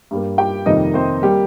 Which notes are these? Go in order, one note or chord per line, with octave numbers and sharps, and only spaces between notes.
G2 G3 A#3
G4 G5
F2 C3 D#3 G3 A#3 D#4 D#5
C4 C5
G3 A#3 G4